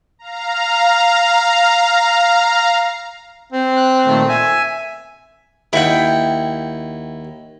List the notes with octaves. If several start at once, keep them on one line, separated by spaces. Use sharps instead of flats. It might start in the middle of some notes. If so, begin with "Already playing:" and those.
F5 A#5
C4
F#6
A#2 D#3 A3
E5 G#5
D#2 E4 F#5 G5